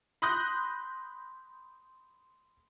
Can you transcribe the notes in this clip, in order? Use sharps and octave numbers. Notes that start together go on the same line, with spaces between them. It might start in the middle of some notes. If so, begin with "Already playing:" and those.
B5 C6 D#6 F#6 G6 A#6